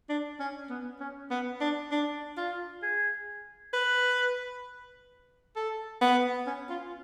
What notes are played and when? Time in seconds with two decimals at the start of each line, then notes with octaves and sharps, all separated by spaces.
0.09 D4
0.39 C#4
0.69 B3
1.00 C#4
1.30 B3
1.61 D4
1.91 D4
2.37 F4
2.82 G#4
3.73 B4
5.56 A4
6.01 B3
6.47 C#4
6.70 F4